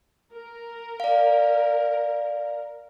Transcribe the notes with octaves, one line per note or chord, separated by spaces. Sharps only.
A#4
D5 F5